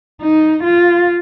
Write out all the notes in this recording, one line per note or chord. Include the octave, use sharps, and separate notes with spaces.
D#4
F4